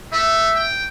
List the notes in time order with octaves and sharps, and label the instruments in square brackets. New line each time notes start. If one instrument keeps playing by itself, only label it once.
[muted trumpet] A3 [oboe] E5
[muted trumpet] G5